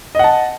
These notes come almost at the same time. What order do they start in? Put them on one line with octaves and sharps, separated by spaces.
D#5 F#5 A5